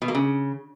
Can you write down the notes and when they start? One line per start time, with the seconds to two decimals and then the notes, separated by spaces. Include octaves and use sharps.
0.02 B2
0.08 A#3
0.15 C#3